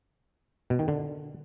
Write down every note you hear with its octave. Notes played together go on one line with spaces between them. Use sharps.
B2
D#3
D3